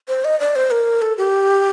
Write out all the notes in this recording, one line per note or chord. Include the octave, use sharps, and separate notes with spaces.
C5
D#5
D5
C5
A#4
A4
G4